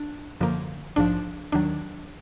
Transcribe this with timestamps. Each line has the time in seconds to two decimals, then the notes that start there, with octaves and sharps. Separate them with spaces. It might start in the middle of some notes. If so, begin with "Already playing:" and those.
Already playing: D4
0.41 F#2 D3 F3 A#3
0.96 A#1 G#2 F3 D4
1.52 D#2 D#3 F#3 D4